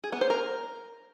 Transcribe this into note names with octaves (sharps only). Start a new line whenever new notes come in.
G#4
B3
C5
A#4